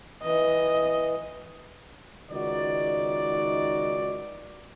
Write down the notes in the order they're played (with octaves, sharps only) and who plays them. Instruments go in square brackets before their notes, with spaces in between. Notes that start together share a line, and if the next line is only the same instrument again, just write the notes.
[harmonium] E3 [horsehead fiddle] D#5
[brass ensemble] C#2 D#3 D#4 F#4 D5